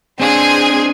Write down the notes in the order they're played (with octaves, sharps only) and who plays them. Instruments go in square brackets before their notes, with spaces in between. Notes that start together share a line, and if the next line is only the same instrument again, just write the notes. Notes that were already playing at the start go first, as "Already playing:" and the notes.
[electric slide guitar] C4 D4 [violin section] G#4 G#5 C6